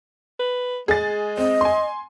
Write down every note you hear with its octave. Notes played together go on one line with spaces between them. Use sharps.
B4
G#3 G#4 A6
C4 D#5
G#5 C6